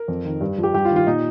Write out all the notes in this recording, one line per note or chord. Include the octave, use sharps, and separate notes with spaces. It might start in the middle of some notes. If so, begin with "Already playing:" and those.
Already playing: A#4
F2
D#3
G2
F3
G4
G2 G4
F4
D#3
F4
A#2 D#4